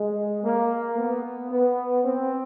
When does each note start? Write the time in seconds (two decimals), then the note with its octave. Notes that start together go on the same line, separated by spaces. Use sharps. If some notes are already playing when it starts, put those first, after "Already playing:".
Already playing: G#3
0.44 A#3
0.98 B3
1.51 B3
2.04 C4